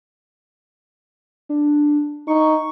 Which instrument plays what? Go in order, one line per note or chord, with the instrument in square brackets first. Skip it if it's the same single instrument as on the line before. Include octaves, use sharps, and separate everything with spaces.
[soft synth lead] D4
[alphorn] D#4 [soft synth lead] C#6